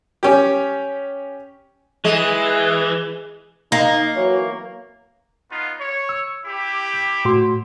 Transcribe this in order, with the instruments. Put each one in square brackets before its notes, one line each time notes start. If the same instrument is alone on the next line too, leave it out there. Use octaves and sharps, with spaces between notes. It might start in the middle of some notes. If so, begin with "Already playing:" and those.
[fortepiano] C#4 G4
[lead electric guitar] E3 [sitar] G#3
[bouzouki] A#3 [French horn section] D#4
[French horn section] E3 F#3 C#5
[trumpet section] B3 D#4 F4
C#5
[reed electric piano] E6
[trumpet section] E4 G4
[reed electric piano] A2 F#4 C6